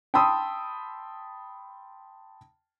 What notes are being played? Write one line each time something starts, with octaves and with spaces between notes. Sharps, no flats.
G5 A5 B5 C6 D#6 E6